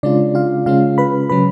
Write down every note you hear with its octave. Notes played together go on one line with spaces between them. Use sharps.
C#3 G#3 C#4 D4 F4 D5
F4 F5
C#3 G#3 C#4 F4 F5
B4 B5
C#3 F#3 C#4 B4 B5